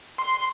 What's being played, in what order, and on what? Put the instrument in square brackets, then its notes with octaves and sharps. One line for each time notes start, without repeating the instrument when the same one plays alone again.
[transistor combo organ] C6